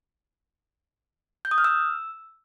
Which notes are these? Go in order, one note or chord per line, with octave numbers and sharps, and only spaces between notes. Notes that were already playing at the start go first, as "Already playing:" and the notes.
G6
D#6
F6
E6